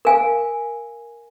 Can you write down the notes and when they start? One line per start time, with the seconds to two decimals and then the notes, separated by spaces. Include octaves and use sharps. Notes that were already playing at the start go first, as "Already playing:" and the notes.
0.05 A#4 F5 G#5